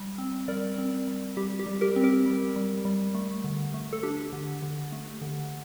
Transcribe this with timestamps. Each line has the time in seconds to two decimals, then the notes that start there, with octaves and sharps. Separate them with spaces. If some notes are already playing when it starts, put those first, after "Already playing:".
Already playing: G3
0.18 C4
0.48 G3 A#4 D5
0.78 C4
1.07 G3
1.37 G3 G4
1.59 G4
1.66 G3
1.81 G4 A#4
1.96 C4
2.04 G4 A#4
2.26 G3
2.56 G3
2.85 G3
3.15 A3
3.44 D3
3.74 A3
3.93 A4
4.03 D4 G4
4.33 D3
4.62 D3
4.92 A3
5.22 D3